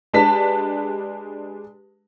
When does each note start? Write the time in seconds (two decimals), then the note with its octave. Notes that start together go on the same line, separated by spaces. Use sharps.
0.13 G#3 D4 G4 B4 A5 B6